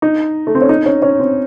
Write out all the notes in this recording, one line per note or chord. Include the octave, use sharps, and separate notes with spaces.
D#4
A3
C4
C#4
D#4
C#4
C#4
C4